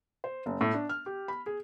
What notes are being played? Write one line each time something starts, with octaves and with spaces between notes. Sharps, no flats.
C5
F#1
A2
D4
F6
G4
B5
G#4